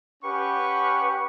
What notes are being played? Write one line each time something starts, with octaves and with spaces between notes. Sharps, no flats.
C#4 G4 B4 F#5 C#6